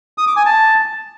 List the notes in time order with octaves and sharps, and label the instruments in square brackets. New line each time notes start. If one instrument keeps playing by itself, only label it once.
[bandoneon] D#6
D6
G#5
A5